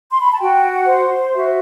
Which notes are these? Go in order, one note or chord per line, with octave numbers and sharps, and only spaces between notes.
C6
B5
A5
F#4 G5
F#5
C5
F#4 E5